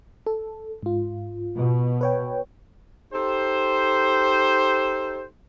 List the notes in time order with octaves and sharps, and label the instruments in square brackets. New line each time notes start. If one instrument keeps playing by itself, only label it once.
[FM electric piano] A4
G#2 F4
[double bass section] B2
[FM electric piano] B4 C#5 G5
[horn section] D#4 G4 A4 C5